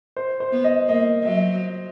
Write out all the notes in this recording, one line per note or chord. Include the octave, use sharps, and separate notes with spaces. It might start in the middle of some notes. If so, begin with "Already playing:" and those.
C5
C5
B3
D#5
A#3 D#5
F#3 E5